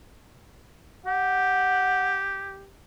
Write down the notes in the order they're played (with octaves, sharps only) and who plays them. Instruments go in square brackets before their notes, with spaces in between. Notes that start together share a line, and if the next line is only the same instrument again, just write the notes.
[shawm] G4 [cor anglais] F#5